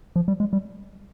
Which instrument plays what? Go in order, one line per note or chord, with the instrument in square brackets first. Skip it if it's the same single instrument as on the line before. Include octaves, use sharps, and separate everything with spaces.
[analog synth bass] F3
G3
G#3
G3